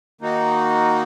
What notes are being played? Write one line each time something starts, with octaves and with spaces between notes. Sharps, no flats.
D#3 A#3 D#4 F#4